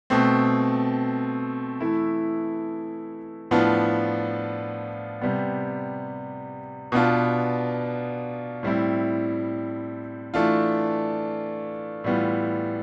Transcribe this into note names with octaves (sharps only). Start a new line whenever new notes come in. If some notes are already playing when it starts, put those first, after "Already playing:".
B2 A3 C4
E3 A3 E4
A2 F3 B3 D4 F4
C3 G3 B3
B2 B3 D4 F4
A2 G3 C4 E4
E3 A3 D4 F4
A2 E3 G3 B3 F4